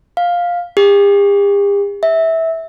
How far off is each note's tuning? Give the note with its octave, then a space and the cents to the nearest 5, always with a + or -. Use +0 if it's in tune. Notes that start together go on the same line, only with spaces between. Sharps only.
F5 +10
G4 +45
E5 -15